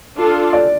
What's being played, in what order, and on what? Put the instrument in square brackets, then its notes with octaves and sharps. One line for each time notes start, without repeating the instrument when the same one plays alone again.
[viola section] D4 F4 A4
[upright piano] D5